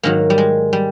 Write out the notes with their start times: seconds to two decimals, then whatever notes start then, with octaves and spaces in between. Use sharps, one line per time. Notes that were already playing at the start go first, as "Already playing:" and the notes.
0.03 G#2 D#3 F#3 A#3
0.30 G3
0.38 G#3
0.73 G3